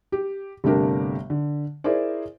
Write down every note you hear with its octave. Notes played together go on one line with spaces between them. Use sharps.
G4
G1 C3 A3 D4 G4 A#4
D3
E4 G#4 A#4 C5 D5